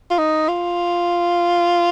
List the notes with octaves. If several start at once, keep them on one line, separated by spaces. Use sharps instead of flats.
F4
D#4
F4